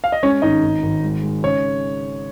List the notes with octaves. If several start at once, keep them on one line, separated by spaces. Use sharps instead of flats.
F5
D#5
G#3 C#4 C#5
G#1 D#4 D#5
G#1
G#1
G#3
G#3
C#3 C#5